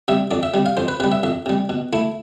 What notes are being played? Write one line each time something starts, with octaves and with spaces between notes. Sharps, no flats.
C3 G3 E5
F2 D5
E5
C3 G3
F5
F2 C5
B4
C3 G3 B4
E5
F2 E5
C3 G3
B2
A3 E4